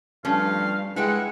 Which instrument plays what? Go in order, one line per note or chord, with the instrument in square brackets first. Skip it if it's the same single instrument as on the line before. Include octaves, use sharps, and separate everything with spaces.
[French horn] G2 [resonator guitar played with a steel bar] F3 A3 C#4 [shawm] F5
[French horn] G#3 [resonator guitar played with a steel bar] E4 B4 G5 [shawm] F#5